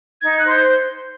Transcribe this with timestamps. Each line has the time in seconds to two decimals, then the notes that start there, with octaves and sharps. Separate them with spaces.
0.22 D#4 G#6
0.39 C5 F#6
0.50 G6